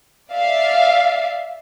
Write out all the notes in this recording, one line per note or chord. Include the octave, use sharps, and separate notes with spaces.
D5 E5 F5